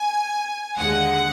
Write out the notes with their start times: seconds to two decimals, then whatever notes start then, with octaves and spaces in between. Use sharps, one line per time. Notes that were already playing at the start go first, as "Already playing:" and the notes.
Already playing: G#5
0.78 D#2 D3 G#3 F#5